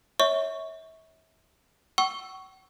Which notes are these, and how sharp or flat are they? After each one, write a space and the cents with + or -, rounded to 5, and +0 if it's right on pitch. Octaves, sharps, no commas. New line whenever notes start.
C#5 +0 E5 -35 C#6 +0
F#5 +40 C#6 +0 E6 +0